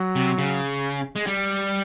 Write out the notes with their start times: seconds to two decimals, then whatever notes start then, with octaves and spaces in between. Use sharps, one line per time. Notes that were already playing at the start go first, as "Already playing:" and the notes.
Already playing: F#3
0.16 C3
0.38 C#3
1.16 G#3
1.27 G3